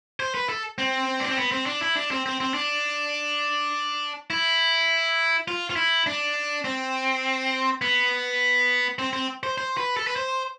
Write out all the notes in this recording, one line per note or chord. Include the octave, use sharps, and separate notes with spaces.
C5
B4
A4
C4
D4
C4
B3
C4
D4
E4
D4
C4
C4
C4
D4
E4
F4
F4
E4
D4
C4
B3
C4
C4
C5
C5
B4
A4
B4
C5